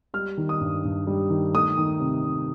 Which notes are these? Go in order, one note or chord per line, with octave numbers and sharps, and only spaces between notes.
G3 F6
D#3
D#6
G2
G2
G3
D#3
A3 D#6
D#3
C3
C3